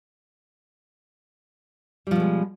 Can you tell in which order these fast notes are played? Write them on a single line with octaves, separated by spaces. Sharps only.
G3 F3 B2 G#3